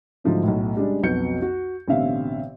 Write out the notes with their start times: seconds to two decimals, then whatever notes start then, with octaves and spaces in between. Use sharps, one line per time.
0.24 G#2 D3 F3 F#3 A3 D4
0.43 B1 A2
0.76 C#3 G3 G#3 D4
1.03 B1 F2 B3 F#4 G6 C#7
1.42 F#4
1.88 A1 B2 D3 C4 E5 F5